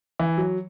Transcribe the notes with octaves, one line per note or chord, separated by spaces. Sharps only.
E3
F#3